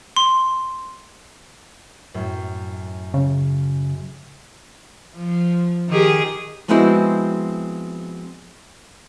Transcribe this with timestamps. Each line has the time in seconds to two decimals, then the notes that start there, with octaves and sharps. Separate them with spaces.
0.17 C6
2.14 F#2 A2
3.14 C#3
5.16 F3
5.89 D#3 G4 G#4
6.68 F3 G#3 B3 C4 E4 F#4